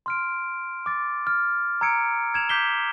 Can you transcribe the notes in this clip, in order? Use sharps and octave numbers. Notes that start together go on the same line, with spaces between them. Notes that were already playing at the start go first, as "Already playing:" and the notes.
C6 F6 D7
D6 A6
F6
A#5 E6 G#6 C#7 D7
G#6 E7 F7
D6 G6 B6 C7 G7